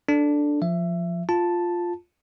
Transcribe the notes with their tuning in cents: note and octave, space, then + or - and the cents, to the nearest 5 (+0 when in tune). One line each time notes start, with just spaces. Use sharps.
D4 +0 A4 +0
F3 +0 E5 +20
F4 +0 A5 +0